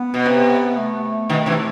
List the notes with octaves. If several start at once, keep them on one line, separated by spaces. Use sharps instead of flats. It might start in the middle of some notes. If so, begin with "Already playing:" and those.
Already playing: B3
B2
C3
A3
B2 D#3
C3 E3